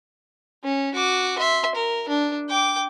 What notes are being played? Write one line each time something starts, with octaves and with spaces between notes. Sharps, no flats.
C#4
F#4 D6
E5 C6
A#4
D4
G5 D6